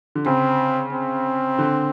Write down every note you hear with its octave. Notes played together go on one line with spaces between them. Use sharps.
D3
C#3 C4
C4
D3